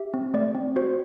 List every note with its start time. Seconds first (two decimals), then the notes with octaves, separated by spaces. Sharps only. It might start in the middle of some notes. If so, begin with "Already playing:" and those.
Already playing: G4 E5
0.14 C4
0.34 A3 D5
0.55 C4
0.76 F#4 C5